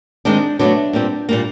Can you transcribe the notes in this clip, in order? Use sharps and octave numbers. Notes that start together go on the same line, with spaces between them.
D#3 G#3 C4 D4
B2 F#3 A3 D4
A#2 G3 C4
A#2 G3 A#3